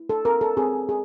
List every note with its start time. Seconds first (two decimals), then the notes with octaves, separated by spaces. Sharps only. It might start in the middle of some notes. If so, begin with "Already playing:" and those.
Already playing: E4
0.10 A4
0.25 C4 A#4
0.41 A4
0.57 C4 G#4
0.89 G#4